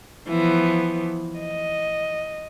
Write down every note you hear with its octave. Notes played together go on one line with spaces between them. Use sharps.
E3 F3 B3
D#5